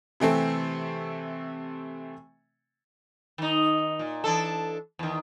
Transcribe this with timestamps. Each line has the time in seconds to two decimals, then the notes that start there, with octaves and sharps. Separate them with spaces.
0.20 C3 E3 A3 C4
3.38 D#3 D#4
3.99 A#2
4.24 E3 D4 A4
4.99 E2 D#3